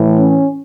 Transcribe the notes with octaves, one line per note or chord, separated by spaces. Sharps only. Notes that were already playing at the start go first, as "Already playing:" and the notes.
Already playing: A2 E3
C#4